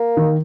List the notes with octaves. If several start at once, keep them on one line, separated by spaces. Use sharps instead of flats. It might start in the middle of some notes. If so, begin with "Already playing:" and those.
Already playing: A#3
D#3